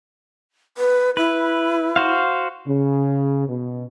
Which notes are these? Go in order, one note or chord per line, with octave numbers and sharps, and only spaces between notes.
B4
E4 B4
F#4 C5 F5
C#3
B2